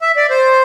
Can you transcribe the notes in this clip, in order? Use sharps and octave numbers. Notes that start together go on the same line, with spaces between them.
E5
D5
C5